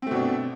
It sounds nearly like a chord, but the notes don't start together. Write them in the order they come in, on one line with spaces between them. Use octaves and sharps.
C4 A3 B2 D4